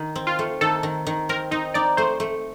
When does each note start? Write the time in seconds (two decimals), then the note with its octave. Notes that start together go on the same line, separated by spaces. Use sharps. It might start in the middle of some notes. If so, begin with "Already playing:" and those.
Already playing: D#3
0.16 C4
0.27 F4
0.39 A3
0.61 D#3 A4
0.83 D#3
1.07 D#3
1.29 C4 A#4
1.51 C4 D#4
1.74 D#4 D5
1.97 A3 C5
2.20 A3